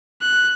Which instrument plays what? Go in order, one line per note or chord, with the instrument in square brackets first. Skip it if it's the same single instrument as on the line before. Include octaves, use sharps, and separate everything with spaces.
[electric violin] F#6